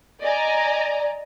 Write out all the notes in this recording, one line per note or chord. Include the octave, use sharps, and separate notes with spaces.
D5 D#5 G#5 A#5